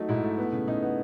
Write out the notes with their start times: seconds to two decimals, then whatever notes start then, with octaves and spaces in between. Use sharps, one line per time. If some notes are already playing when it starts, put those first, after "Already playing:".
Already playing: F#3 A3 D#4
0.09 G#2 E4
0.24 A3
0.38 B3
0.52 C#3
0.67 C#3 D#4
0.83 B3